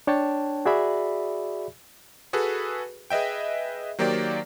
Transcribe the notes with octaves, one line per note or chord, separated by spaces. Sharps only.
D4 C#5 G5 A5
F#4 G#4 D5 E5 B5
F#4 G#4 A4 B4
G#4 B4 D#5 E5 G5
D#3 F#3 A#3 G4 C5 D5